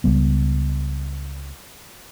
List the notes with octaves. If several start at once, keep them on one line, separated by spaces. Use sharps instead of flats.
C#2 G3 B3